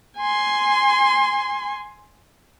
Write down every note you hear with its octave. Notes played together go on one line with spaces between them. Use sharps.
G#5 C6